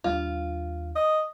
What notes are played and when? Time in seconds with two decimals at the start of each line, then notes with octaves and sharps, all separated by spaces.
0.04 D#2 G3 D4 F4
0.95 D#5